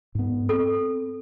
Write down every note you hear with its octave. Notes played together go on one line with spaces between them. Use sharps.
G#2 B3
C4 A4